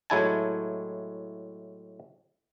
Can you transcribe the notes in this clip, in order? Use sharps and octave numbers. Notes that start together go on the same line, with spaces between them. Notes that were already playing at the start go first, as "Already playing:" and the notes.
A2 F#3 G#3 E4 G#5 A5